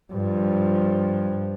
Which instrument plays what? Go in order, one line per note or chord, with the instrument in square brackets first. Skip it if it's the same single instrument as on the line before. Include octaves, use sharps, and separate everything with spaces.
[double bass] G2 F3